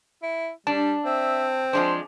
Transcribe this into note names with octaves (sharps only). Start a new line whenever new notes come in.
E4
G3 D4 A5
C4 E5
F3 G#3 D4 C5